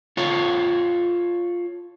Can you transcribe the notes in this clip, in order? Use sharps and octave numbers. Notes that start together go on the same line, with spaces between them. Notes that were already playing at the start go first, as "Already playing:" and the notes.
F4 A4 C#5